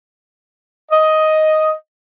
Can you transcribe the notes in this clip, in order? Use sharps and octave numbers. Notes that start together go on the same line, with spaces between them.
D#5